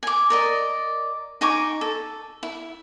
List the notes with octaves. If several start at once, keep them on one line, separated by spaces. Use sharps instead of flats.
G#5 D6
A#4 D5 D#5
D#4 G#5 C#6 D6
A4
E4